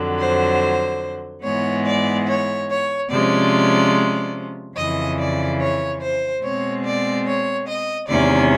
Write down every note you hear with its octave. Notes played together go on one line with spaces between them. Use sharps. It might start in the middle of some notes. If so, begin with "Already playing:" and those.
Already playing: F2 D3 F#3
C5
G#2 E3 G#3 B3 C#5
D5
C#5
C#5
C3 F3 G#3 C#4 D5
F2 C#3 E3 D#5
D5
C#5
C5
B2 G#3 C4 C#5
D5
C#5
D#5
E2 C3 D#3 G#3 C#4 D5